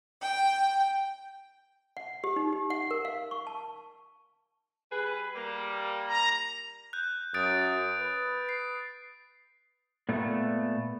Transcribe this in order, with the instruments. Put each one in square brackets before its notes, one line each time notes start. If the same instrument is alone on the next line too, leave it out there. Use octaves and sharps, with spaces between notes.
[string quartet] G5
[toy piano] F#5
G4
D#4
G4
F#5
A#4
F5
C#6
A5
[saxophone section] G3 G#4 B4
G3 A#3
[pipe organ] A#5
[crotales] F#6 G6
[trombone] F#2 [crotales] D#6 A6 D7
[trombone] B4
[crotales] C7
[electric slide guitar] A#2 A3 B3